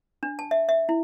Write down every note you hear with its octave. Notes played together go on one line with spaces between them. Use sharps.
D4
A5
E5
E5
E4